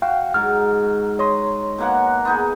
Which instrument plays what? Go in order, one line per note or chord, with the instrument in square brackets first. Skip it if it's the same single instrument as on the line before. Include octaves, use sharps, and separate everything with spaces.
[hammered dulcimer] F#4 [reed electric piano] F5 G5
[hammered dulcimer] G#2 F#3 [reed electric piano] F6
[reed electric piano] C#5 C6 [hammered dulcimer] D#5
[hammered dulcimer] B2 A#3 F#5
B3 D#4 G#4